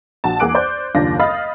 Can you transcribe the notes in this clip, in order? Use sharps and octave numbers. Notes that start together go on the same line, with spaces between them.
A#1 F#4 A5
E2 A#3 G#4 D6 F#6 D7
C5 D5 D6 G6
F#1 D#2 D4 F4 A#6
D#5 F5 B5 D#6 F6 A6